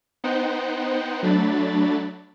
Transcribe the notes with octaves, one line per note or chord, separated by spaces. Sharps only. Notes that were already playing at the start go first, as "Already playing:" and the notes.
B3 D#4 C5 F#5 G5
F#3 A3 D4 B5 A6